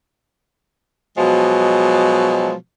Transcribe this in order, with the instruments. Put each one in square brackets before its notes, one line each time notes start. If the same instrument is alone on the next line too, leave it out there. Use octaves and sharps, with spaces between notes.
[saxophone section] B2 F3 F#3 G#3